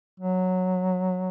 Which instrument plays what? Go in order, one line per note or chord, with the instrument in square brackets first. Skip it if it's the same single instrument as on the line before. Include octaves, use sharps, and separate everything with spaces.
[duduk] F#3